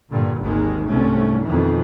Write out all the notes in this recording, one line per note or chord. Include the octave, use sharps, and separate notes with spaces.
G2 A#2 D3
G#1 D#2 D#3 G#3
C2 G#2 C3 A3 C#4
F2 B2 D#3 E3